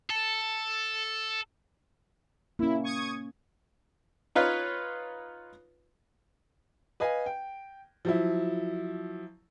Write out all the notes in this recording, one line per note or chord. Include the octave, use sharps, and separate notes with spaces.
A4
A#3 C#4 E4
C#6 D#6 G#6
D#4 F4 B4 C#5 F5
B4 D#5 F5 G#5
G5
F3 F#3 E4